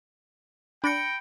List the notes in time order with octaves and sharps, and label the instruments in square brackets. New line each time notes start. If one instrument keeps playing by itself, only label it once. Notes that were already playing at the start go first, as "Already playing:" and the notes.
[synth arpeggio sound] D4 [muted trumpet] G5 [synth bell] B5 A#6 C#7